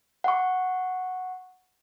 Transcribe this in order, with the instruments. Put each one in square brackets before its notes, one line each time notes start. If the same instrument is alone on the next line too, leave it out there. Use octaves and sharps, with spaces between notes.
[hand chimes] F#5 C#6